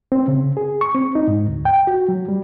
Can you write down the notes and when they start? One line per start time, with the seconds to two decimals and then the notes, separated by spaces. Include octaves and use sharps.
0.12 C4
0.28 C#3
0.57 G#4
0.81 C#6
0.94 C4
1.15 D#4
1.28 G#2
1.48 D2
1.65 G5
1.87 F#4
2.09 F#3
2.29 G3